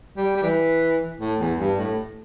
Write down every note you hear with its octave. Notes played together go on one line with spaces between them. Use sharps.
G3
G3
E3
A2
E2
G2
A2